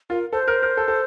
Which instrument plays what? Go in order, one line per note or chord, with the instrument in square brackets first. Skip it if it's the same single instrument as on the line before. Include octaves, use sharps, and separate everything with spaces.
[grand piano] F4 [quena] A#4
[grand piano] A4 [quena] C5
[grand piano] A#4
A#4
A4
A4